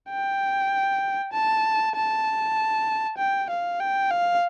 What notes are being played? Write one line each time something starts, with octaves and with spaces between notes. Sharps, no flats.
G5
A5
A5
G5
F5
G5
F5